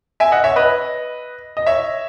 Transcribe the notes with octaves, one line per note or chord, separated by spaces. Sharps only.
E5 G#5
D#5 F#5
C#5 E5
B4 D#5
D#5
C#5 E5